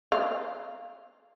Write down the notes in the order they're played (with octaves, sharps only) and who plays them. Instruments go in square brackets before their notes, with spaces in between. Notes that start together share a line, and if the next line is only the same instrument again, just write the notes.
[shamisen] F5